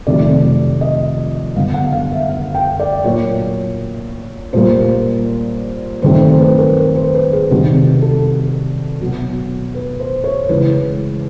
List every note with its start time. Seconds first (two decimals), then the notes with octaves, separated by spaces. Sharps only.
0.07 F2 C3 D#3 F#3 A3 D5
0.81 D#5
1.55 G2 D3 F#3 B3 F5
1.74 F#5
1.92 F5
2.12 E5
2.29 F5
2.55 G5
2.80 D5
3.04 A#2 F#3 A#3 C#5
4.53 A#2 G3 A#3 C5
6.02 G2 D#3 F#3 A3 C4 C5
6.21 C5
6.40 B4
6.58 A#4
6.77 B4
6.95 C5
7.15 B4
7.33 G#4
7.51 C3 D#3 G3 F#4
8.01 A4
9.00 B2 F#3 B3
9.75 B4
10.00 C5
10.24 C#5
10.49 C#3 E3 G#3 B4